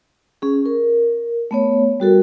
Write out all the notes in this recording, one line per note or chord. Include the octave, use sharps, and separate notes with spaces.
C#4 G#4
A#4
A3 B3 C#5
G3 F#4 A4 A#4